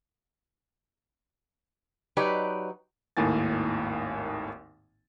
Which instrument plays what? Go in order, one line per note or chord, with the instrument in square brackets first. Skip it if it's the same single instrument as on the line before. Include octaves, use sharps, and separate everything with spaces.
[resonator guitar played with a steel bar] F#3 D#4 G4 B4 C#5 D5
[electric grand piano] G#1 D#2 A2 A#3 G#5 A6